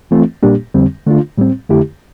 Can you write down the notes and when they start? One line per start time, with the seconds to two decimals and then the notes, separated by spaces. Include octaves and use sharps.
0.11 E3 A3 C4 F4
0.43 A#2 G3 A#3 D4 G4
0.74 F2 D3 G3 C4
1.06 D3 A3 D4 F4
1.38 A2 G3 C4
1.69 F2 D3 A3 E4 G4